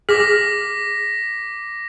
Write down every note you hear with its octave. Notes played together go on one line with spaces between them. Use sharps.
G#4 D6 A#6 B6